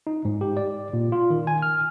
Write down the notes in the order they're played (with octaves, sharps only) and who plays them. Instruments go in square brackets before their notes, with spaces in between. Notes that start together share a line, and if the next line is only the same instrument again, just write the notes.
[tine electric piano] D#4
G#2
G4
D5
A#2
F4
D#3
G#5
F6